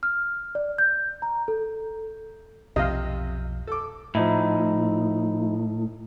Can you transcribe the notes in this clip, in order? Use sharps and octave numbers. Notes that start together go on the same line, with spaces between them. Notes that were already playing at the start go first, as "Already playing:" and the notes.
F6
D5
G6
A#5
A4
B1 F2 C3 F3 D#5 F5
A4 D6
A2 F3 D#4 E4